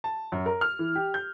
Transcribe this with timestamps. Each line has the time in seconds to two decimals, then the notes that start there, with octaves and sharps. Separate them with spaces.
0.04 A5
0.32 F#2
0.46 A#4
0.61 F6
0.79 E3
0.95 G4
1.14 G6